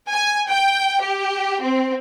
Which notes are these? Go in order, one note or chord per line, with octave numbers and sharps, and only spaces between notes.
G#5
G5
G4
C4